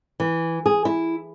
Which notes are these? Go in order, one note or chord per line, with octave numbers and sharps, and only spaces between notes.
E3
G#4
E4